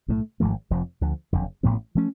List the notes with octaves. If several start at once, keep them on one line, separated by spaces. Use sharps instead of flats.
B1 A2 F3 A3
G#1 G#2 F3 A3
F1 F2 F3
D2 D3 F3
F#1 F2 D3
A1 A2 F3 B3
F3 A3 C#4